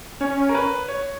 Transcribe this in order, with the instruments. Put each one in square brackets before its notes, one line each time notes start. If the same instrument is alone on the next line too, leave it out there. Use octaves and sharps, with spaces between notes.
[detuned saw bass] C#4 [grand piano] C#5
[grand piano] A#4
B4
C#5